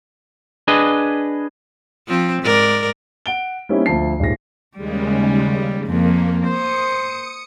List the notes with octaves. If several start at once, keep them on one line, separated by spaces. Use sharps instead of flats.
D4 G#4 B4 D#5
F3 C4
G#2 A#4 D5
F#5 D7 G7
G3 A#3 C4 C#4 D#4 E4
D2 F3 A5 C7
D#1 G#2 A#6
D#2 C#3 G3 G#3
F2 A#3
C5 D#6 C#7